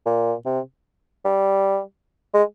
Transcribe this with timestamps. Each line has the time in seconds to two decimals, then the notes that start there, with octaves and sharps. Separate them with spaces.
0.06 A#2
0.46 C3
1.25 G3
2.34 G#3